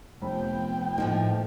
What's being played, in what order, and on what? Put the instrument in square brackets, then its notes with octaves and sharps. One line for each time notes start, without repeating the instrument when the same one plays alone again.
[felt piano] F1 B5 [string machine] F3 B3 [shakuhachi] G5
[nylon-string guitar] A2 F3 A#3 [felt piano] D#4